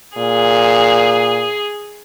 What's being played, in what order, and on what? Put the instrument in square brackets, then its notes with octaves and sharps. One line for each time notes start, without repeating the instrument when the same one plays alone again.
[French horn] A#2 [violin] G#4